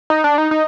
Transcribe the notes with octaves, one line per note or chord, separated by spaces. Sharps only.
D#4
D4
D#4
D#4